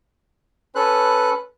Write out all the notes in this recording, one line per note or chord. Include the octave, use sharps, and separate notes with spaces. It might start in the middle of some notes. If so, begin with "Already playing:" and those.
C#4 A4 B4 F#6